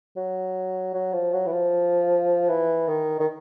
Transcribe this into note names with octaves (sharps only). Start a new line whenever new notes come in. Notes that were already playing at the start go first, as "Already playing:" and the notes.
F#3
F#3
F3
F#3
E3
F3
E3
D#3
D#3